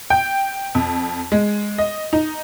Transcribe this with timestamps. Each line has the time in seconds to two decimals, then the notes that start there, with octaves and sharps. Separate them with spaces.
0.10 G5
0.75 F2
1.32 G#3
1.78 D#5
2.13 D#4